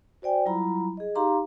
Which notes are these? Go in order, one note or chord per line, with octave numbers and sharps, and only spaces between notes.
F#4 C5 D5 G5 G#5
F#3 G3 E4 F4 A#5 B5
G#4 D#5
D#4 G4 F5 A#5 C6 D6